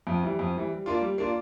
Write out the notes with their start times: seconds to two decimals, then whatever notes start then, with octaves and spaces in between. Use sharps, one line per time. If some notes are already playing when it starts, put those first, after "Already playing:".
0.07 F2
0.23 E3 G3
0.39 F2
0.55 E3 G3
0.71 G3
0.86 A#3 D4 F4
1.01 G3
1.18 A#3 D4 F4